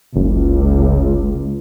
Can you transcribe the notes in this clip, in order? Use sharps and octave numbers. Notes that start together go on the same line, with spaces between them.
F#1 C#2